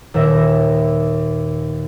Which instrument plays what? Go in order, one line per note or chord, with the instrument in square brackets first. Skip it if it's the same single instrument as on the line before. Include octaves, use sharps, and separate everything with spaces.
[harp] D#2 A#2 B3 E5 A#6